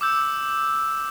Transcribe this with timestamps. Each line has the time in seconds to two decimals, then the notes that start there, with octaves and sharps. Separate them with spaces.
0.01 D6 E6 G6